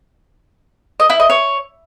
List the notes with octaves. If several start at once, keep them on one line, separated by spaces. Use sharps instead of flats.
D#5
E4
D#5
C#5